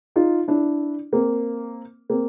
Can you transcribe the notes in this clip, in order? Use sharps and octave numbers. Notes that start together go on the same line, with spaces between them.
D#4 F4
D4 E4
A#3 C4
A#3 C4